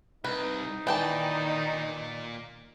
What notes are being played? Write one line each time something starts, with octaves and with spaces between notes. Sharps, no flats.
C2 D#4 B4
A#2 D#3 E3 D5 G5 A5